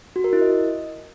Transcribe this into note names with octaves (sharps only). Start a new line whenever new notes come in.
F#4
A#4
E4
D#5